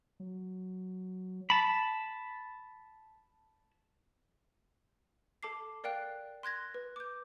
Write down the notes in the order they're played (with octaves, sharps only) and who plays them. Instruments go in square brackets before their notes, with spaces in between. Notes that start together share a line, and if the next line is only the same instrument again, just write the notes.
[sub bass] F#3
[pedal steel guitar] A5 B5
[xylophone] A4 A5 D6 C7
A#4 D5 F5 G5 F#6
C6 F#6 G#6 A#6
B4
D6 G6